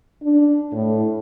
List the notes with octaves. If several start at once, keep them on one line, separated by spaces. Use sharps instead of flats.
D4
A2